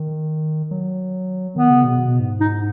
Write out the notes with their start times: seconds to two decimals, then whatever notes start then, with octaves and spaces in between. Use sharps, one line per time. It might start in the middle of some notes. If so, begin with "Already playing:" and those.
Already playing: D#3
0.71 F#3
1.56 D#3 B3
1.70 C#3
1.84 B2
1.98 B2
2.20 G#2
2.40 D#4